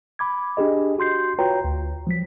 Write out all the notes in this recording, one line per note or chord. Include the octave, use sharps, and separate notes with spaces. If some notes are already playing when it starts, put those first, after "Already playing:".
B5 D6 G#6
D4 G4 G#4 D#5
F#4 C6 G6 C7
F4 F#4 B4 C#5 G5 A#5
D2
F3 F#3 B6